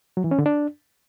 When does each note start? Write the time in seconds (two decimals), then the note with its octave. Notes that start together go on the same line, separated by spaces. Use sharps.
0.17 F#3
0.24 E3
0.31 C#4
0.39 D3
0.46 D4